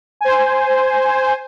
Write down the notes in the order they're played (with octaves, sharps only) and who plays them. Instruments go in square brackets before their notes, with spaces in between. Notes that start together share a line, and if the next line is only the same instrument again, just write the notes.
[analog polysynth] C5 G#5